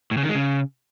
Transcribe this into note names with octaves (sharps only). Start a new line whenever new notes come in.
A2
C#3
D#3
G#3
C#3